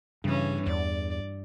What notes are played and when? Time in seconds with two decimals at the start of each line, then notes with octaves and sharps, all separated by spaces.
0.24 G2 C#3 E3 C#4
0.67 E2 D5